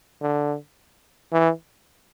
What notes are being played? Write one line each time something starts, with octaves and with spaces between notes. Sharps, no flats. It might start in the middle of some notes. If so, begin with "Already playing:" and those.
D3
E3